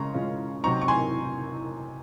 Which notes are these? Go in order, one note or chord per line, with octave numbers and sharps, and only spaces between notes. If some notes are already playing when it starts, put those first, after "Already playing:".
Already playing: C#3 G#3 C#4 A#5 C6 C#6
C#3 G#3 C#4 F4
C3 F#3 C4 D#4 A#5 C#6
C#6
G#5 C6